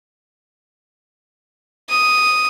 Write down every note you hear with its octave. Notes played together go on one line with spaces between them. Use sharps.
D#6